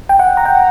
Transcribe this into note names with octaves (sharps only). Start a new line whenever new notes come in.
G5
F#5
A#5
G5